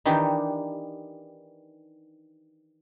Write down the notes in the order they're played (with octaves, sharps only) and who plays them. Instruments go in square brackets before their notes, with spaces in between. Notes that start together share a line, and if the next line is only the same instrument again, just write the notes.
[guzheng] D#3 E3 D4 D#4 G4